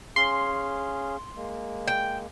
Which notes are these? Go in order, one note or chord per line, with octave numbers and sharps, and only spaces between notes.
C#4 G#4 F5 C6
G#3 A#3
G5